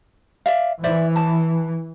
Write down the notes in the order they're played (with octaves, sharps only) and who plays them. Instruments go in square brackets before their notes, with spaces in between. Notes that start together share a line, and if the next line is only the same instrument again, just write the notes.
[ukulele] D5 E5 F5
[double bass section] E3 [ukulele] C5 D5 E5
[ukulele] A5